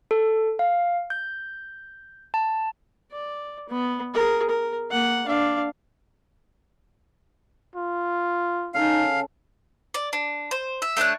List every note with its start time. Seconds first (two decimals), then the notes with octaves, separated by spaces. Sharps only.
0.11 A4
0.59 F5
1.10 G6
2.34 A5
3.12 D5
3.69 B3
4.14 G#4 A#4
4.49 A#4
4.90 A#3 F#5
5.27 D4 F5
7.76 F4
8.74 C#3 D#4 A4 F5
9.94 D5
10.13 D4
10.51 C5
10.82 E5
10.97 A3 D4 C#5 F#6